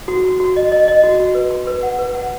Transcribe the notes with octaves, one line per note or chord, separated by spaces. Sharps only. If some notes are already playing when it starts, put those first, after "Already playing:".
F#4
F#4
F#4
D#5
D#5
D#5
F#4
F#4
B4
C6
B4
F#5
B4
F#5